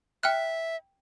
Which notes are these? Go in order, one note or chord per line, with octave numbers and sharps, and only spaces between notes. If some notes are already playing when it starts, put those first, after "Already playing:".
E5 G5 F6 F#6